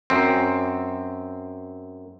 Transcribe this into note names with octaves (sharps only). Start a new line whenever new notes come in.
F#2 C4